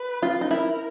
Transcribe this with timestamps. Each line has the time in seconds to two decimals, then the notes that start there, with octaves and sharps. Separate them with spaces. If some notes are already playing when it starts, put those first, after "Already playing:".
Already playing: B4
0.22 F4
0.41 D#4
0.50 E4 A#4